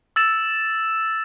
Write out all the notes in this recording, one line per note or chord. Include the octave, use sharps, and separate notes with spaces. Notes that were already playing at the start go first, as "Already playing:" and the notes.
E6 A6 E7